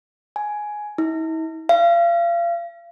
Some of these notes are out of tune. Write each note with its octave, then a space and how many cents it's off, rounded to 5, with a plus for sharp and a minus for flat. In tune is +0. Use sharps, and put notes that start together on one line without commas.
G#5 +10
E4 -45
F5 -35